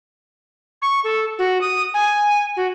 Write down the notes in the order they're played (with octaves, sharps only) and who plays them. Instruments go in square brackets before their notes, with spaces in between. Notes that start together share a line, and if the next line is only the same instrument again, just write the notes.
[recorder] C#6
A4
F#4
D#6
G#5
F#4